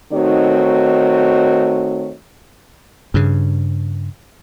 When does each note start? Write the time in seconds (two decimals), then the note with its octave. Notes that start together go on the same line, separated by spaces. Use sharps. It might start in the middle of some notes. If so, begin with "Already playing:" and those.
0.13 D#3 A3 C4 D#4 F#4 C#5
3.14 G2 C#3